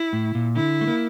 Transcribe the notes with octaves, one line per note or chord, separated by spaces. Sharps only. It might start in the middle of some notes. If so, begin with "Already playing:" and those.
Already playing: E4
A2
A#2
D3 E4
A3
A#3